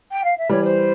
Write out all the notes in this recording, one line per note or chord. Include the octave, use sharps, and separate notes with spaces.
G5
F5
E5
E3 G3 C#5
C5